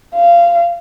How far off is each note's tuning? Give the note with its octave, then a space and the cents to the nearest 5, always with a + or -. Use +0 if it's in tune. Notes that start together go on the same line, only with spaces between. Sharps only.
F5 -20